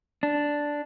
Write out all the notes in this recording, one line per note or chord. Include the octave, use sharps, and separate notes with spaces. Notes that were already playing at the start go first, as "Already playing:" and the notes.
D4